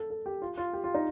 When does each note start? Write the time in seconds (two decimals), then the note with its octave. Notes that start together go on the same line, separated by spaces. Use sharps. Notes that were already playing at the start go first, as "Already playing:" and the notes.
Already playing: A4
0.10 A4
0.26 G4
0.42 F4
0.58 F4
0.73 G4
0.84 F4
0.94 D#4